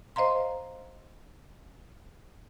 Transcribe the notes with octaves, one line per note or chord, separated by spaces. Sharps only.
C5 D#5 F5 A#5 C6